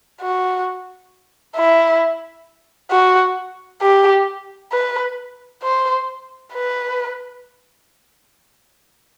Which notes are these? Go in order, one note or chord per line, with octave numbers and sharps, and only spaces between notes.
F#4
E4
F#4
G4
B4
C5
B4